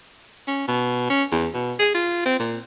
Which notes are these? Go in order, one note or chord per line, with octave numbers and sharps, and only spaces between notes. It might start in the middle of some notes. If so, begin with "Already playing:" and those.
C#4
B2
C#4
E2
B2
G#4
F4
C4
A#2